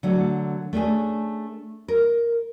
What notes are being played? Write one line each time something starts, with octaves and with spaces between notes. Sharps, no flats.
D3 F#3 A3
A3 C#4 D4 G#4
A#4